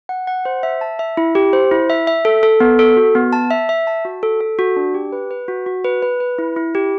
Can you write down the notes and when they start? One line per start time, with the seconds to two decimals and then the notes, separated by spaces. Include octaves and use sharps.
0.09 F#5
0.27 F#5
0.45 C5
0.63 E5
0.81 A5
0.99 E5
1.17 E4
1.35 G4
1.53 C5
1.71 E4
1.90 E5
2.07 E5
2.25 A4
2.43 A4
2.60 B3
2.79 A4
2.97 F#4
3.15 B3
3.33 A5
3.50 E5
3.69 E5
3.87 A5
4.05 F#4
4.23 A4
4.41 A4
4.59 F#4
4.76 D4
4.94 G4
5.12 B4
5.31 B4
5.48 F#4
5.66 F#4
5.84 B4
6.02 B4
6.20 B4
6.39 E4
6.56 E4
6.75 G4